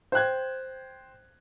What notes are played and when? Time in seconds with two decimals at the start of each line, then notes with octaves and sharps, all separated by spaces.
0.12 C5 G5 F#6 G#6